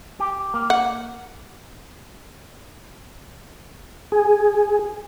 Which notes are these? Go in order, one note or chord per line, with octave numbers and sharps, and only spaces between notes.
G4
A#3
F#5
G#4